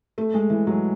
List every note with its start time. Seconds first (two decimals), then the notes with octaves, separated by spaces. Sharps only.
0.18 A3
0.34 G#3
0.50 E3
0.67 F#3